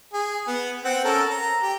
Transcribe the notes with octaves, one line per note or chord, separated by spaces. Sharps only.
G#4
B3
C4 F#5
C#4 A4 A#4
A#5
G4